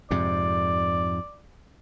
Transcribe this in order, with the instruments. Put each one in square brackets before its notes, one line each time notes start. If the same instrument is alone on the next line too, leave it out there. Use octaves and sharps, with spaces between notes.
[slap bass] F2 G#2 C3 [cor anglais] D5